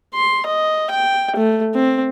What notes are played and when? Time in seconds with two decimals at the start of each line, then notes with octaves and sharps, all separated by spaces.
0.14 C6
0.46 D#5
0.90 G5
1.36 A3
1.74 C4